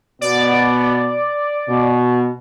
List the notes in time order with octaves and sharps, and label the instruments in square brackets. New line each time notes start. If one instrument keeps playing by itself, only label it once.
[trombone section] B2 B3 [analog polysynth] D5
[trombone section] B2